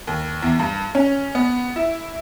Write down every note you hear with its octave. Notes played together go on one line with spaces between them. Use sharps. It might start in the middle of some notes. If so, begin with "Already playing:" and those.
D#2
E2
G2
C#4
B3
E4